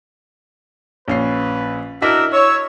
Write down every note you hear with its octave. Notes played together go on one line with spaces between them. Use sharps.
A#1 C#4 B4 C7
D4 E4 F#4 A#4 D#5 E6 B6
C#5 E6